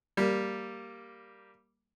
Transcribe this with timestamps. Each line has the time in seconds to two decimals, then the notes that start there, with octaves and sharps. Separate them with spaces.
0.17 G3 A#3